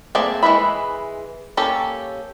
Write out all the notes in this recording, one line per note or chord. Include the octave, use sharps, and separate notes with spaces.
A3 A#3 C4 G#4 D5
E3 G#3 B4 E5 B5
A#3 C#4 G4 A4